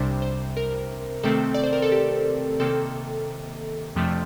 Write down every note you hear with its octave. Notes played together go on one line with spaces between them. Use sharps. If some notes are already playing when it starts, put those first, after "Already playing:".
Already playing: C2 C3 G3 D4 C5
C5
A#4
C3 D#3 A3 C4 A4
D5
C5
A#4
A4
G4
C3 D#3 A#3 A4
F2 C3 F3 A3 D4